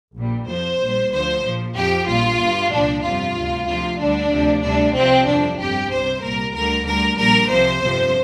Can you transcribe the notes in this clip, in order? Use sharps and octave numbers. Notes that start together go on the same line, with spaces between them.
A#1 A#2 G3
F2 F3 C5
A#1 A#2 G3
D2 D3 F3 C5
A#1 A#2 F3
F2 F3 G4
A#1 A#2 G3 F4
G1 G2 G3
C2 A#2 F3 D4
G1 F2 C3 G3 F4
D2 C3 G3
D2 C3 F3 F4
D2 D3 G3 D4
D2 C3 F3
D2 C3 G3 D4
C2 C3 F3 C4
G1 F2 C3 F3 D4
G1 F2 C3 G3 G4
C2 C3 G3 C5
C2 A#2 G3 A#4
D2 D3 G3 A#4
D2 D3 G3 A#4
A#1 A#2 G3 A#4
C2 C3 F3 C5
G1 F2 C3 F3